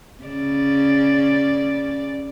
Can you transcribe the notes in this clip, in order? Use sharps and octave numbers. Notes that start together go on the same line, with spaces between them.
C#3 D5